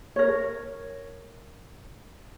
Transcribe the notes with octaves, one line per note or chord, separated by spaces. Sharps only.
A#4 C#5